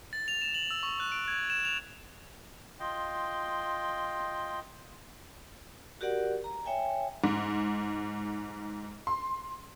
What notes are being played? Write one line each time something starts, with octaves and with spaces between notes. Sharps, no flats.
A6
F7
E7
F#7
E6
C#6
F#6
D7
G#6
E7
F7
F4 D#5 G5 C6
F#4 G4 A#4 D5 F#5
A#5
C#5 E5 G5 G#5
G#2
C6